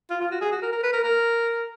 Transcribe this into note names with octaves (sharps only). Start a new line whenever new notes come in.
F4
F4
F#4
G#4
F#4
A#4
A#4
B4
A#4
A#4